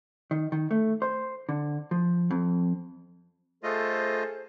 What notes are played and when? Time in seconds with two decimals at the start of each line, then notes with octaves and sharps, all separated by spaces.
0.31 D#3
0.52 D#3
0.71 A3
1.02 C5
1.49 D3
1.91 F3
2.31 F2
3.63 A3 F4 G#4 A4 C5 D#5